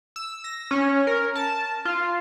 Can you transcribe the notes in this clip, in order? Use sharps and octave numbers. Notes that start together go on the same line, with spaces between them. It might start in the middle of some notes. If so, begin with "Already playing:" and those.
E6
A#6
C#4
A#4
A5
F4